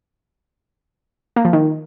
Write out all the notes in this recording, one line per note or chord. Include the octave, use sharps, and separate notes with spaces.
A#3
F3
D#3